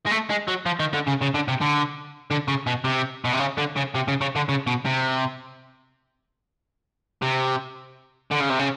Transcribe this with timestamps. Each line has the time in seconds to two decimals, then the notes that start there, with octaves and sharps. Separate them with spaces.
0.06 G#3
0.11 A3
0.30 G#3
0.48 F#3
0.66 F3
0.80 D#3
0.93 D3
1.07 C#3
1.21 C#3
1.34 D3
1.48 C3
1.61 D3
2.31 D3
2.48 C#3
2.67 B2
2.84 C3
3.25 B2
3.33 C3
3.39 C#3
3.57 D3
3.76 C#3
3.95 C3
4.08 C#3
4.21 C#3
4.36 D3
4.49 C#3
4.67 B2
4.85 C3
7.22 C3
8.31 D3
8.41 C#3
8.50 C3
8.59 C#3